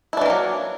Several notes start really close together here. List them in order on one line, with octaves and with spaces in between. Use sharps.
E4 D4 E3 A#3 F#3